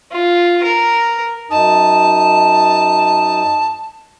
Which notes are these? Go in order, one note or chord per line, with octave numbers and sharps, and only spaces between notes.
F4
A#4
F#2 D#4 A5 D#6